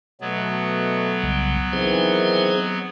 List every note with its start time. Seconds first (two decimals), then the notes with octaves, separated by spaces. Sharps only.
0.21 B2 F#3 A3 B3
1.23 C2 C#3 G3
1.73 D#3 E3 C4 G#4 C5